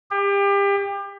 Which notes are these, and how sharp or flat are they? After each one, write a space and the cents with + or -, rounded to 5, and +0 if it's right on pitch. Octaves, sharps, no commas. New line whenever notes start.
G4 +30